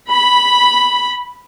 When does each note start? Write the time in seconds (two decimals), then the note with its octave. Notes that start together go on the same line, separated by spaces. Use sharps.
0.11 B5